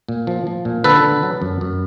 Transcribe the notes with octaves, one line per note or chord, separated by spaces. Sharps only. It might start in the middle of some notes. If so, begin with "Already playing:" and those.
A#2
F3
F3
A#2
D3 A4 B4
D3
F#3
F#2
F#2